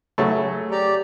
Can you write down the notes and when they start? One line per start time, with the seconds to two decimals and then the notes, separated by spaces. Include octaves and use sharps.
0.18 C#3 F#3 A3
0.71 G4 D5 A#5